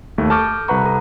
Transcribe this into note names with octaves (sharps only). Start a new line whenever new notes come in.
D#2 A3
A4 A5 C#6 D6 F6 G6
C2 B4 F#5 A#5 C#6
A4